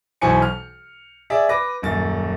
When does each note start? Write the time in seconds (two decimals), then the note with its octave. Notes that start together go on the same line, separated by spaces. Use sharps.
0.21 B1 B2 E3 C5 G#5 C#7
0.42 F6
1.30 G#4 D5 E5
1.49 B4 D6 A#6
1.82 D#1 F#2 A6